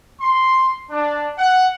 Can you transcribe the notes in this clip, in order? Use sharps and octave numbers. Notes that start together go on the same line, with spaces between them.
C6
D4
F#5